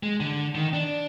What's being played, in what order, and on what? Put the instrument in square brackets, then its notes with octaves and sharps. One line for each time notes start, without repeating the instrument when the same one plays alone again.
[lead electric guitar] G#3
D3
D#3
D4